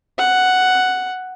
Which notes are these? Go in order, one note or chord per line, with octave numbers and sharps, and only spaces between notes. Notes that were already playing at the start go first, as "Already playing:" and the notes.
F#5